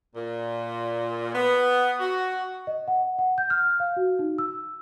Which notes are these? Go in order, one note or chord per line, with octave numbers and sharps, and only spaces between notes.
A#2
B3
F#4
D#5
F#5
F#5
G6
F6
F5
F#4
D#4
E6